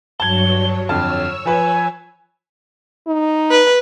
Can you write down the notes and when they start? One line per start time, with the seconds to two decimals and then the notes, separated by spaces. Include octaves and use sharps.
0.20 G2 F#3 C#5 A5 G#6 G7
0.89 F2 D3 C#5 A5 E6 F6
1.46 F3 B4 G#5
3.07 D#4
3.51 B4